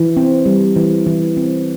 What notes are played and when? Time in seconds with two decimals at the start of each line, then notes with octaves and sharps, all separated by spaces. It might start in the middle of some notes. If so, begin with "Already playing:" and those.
Already playing: E3
0.17 C4
0.46 G3
0.76 E3
1.06 E3
1.37 C4